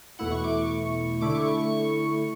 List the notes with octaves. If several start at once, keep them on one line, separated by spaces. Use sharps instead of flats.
E2 B2 A3 E4 F#5
C#6
D6
C#6
D3 A3 E4 D6
C#6
C#6
C#6